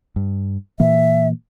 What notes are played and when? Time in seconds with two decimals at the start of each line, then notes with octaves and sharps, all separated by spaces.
0.16 G2
0.80 A#2 E3 A#3 E5